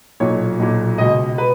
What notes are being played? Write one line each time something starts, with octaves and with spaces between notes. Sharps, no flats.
B1 A#2 C#5
B1 A#2
C#2 B2 D#5
B4